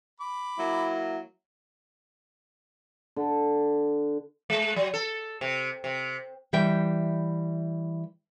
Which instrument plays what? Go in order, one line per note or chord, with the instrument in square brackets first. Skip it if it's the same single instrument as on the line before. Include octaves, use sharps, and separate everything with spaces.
[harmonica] B5 D6
[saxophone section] F#3 A#3 E4
[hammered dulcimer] D3
[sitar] G#3
F#3
A4
C3
C3
[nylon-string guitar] E3 G3 E5 G5